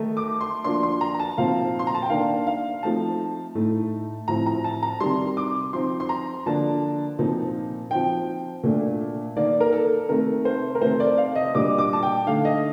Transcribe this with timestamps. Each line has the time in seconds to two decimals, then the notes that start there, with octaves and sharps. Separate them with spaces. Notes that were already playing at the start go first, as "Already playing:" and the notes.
Already playing: D#3 A3 D#4
0.17 D6
0.41 C6
0.64 F3 A#3 D4 C6
0.83 C6
1.01 A#5
1.14 A#5
1.20 A5
1.38 A#2 F3 C4 D#4 F5
1.79 C6
1.87 A#5
1.95 A5
2.02 G5
2.10 D#3 A#3 D4 F5
2.47 F5
2.83 F3 A3 C4 D#4 A5
3.55 A2 A3 D#4
4.28 A2 F3 C4 A#5
4.46 A#5
4.64 A5
4.83 A#5
5.00 C3 D#3 G3 C6
5.37 D6
5.73 F3 C4 D#4 C6
6.00 C6
6.09 A#5
6.46 D3 F3 A#3 D4 A5
7.19 A#2 F3 C4 D#4
7.91 F3 C4 D#4 G5
8.64 A#2 A3 D4
9.36 D#3 A#3 D#4 D5
9.60 A#4
9.73 A4
10.09 C3 D#3 A3 A#4
10.45 C5
10.75 A#4
10.82 C3 D#3 A3 D#4 C5
11.00 D5
11.18 F5
11.35 D#5
11.54 A#2 G3 D4 D6
11.78 D6
11.93 A5
12.03 G5
12.26 D3 A3 D#4 F5
12.45 D#5